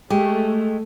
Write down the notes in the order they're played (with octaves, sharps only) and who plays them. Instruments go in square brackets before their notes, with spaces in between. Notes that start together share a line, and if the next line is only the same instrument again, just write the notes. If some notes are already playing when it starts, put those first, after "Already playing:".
[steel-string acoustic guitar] G#3 [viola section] A3 [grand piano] G4